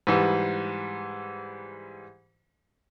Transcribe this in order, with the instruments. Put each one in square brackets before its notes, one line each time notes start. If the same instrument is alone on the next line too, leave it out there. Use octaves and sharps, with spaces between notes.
[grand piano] G#2 E3 G3